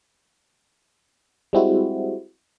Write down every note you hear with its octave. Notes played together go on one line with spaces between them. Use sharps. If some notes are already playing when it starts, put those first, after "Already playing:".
G3 G#3 C4 E4 F#4